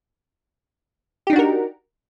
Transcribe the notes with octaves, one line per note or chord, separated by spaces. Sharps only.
D4 D#4 F#4 G4 A#4